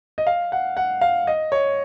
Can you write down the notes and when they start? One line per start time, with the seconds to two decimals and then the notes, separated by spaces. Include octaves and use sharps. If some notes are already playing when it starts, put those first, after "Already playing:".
0.18 D#5
0.27 F5
0.52 F#5
0.77 F#5
1.01 F5
1.27 D#5
1.52 C#5